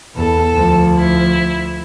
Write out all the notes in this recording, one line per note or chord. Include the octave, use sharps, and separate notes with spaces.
E2 A4
D2 F3
E4